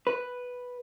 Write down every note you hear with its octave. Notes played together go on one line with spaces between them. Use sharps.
B4